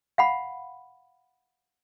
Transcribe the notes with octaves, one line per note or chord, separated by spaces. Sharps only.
F5 F#5 B5